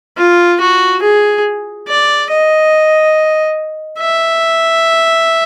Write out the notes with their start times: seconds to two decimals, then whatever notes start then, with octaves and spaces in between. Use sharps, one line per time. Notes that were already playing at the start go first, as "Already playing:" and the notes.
0.18 F4
0.60 F#4
1.02 G#4
1.88 D5
2.30 D#5
3.99 E5